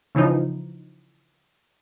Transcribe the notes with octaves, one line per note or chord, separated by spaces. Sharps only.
C#3 E3 F3 D#4